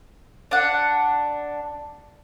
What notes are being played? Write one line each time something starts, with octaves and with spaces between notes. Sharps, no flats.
D4 F#5